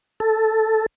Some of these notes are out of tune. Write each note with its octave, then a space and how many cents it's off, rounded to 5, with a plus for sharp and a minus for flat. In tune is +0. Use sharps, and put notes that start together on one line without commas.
A4 +0